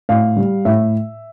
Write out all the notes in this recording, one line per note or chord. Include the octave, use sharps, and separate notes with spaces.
A2 F5
G3
A2 E5